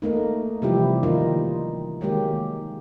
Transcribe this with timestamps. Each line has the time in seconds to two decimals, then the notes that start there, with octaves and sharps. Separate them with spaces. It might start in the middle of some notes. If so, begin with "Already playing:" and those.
0.02 A3 A#3 D#4
0.62 C3 E3 F3 G3 E4 G4
1.03 D#3 A#3 D#4 F4
2.01 D#3 F#3 G#3 A#3 G4